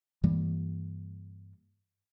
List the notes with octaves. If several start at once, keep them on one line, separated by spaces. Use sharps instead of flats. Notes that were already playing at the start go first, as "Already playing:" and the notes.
G2 E3 G3 A#3